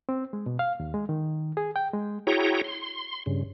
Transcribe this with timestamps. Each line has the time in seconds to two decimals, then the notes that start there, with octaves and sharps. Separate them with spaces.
0.09 C4
0.33 G#3
0.46 B2
0.59 F5
0.80 D#2
0.94 G#3
1.09 D#3
1.57 G#4
1.76 G5
1.93 G#3
2.27 E4 F#4 G#4 C#5 G5 A#5
2.64 C6
3.26 G2 C#3